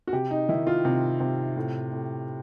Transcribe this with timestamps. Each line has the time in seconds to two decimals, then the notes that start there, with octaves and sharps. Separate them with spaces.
0.07 F#4
0.13 C3 G4
0.31 D#4
0.49 D#3 E4
0.67 F4
0.85 C3
1.20 C3
1.56 A2
1.92 A2